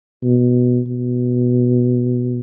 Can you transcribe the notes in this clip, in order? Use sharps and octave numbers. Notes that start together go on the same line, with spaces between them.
B2
B2